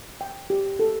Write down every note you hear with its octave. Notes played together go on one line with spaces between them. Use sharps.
G5
G4
A4